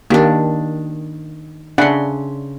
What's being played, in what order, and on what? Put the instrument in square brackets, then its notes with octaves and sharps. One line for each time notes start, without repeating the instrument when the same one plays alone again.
[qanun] D#3 D4 [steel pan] A#3 G4
[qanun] C#3 C6 [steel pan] D4 E5 F#5